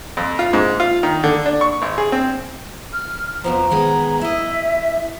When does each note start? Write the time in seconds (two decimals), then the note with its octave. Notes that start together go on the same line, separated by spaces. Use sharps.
0.17 F2
0.39 F4
0.53 G#2
0.80 F4
1.03 D#3
1.24 D3
1.46 D4
1.61 C#6
1.82 G#1
1.98 G#4
2.12 C4
2.93 F6
3.44 F2 B2 F3 A#5
3.71 D#3 G#3 B3
4.21 E4 D#5 E5